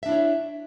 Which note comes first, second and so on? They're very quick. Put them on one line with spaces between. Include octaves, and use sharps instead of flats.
E5 D4 E4 C#5